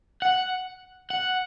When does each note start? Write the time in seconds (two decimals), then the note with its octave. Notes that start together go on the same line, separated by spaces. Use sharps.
0.22 F#5
1.10 F#5